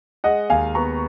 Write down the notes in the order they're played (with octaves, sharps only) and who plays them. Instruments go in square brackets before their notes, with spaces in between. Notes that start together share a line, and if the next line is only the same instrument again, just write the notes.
[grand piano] G#3 [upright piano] D#5 F#5
[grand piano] D#2 [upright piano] F5 G#5
[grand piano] B3 [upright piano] A#5 C#6